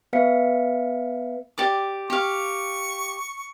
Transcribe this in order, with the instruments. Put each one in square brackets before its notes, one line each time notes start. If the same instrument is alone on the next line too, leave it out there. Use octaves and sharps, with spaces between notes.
[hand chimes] B3 B4 E5 F5 B6 C#7
[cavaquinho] G4 D5 D6
[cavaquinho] G4 F5 [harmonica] C#6